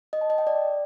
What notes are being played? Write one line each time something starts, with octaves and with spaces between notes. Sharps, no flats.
D#5
A5
D#5
G5
D5